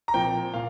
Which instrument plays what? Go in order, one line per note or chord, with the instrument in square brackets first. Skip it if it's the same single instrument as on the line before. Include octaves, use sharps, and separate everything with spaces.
[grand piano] A#5
[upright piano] A#2 F3 C4 [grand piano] G5
[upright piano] A#2 [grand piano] F5